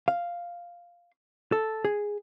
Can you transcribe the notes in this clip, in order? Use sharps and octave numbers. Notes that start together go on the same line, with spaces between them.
F5
A4
G#4